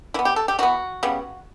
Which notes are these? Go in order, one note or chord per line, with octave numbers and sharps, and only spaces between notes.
E3 B3 E4
G4
A4
G4
E3 B3 F#4
C#3 G3 B3